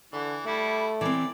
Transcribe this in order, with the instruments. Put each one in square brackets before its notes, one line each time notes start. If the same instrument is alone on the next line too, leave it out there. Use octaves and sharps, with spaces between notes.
[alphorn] D3 [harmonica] E3
[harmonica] G3 E4 [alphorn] A3
[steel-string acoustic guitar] E3 C4 [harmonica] D5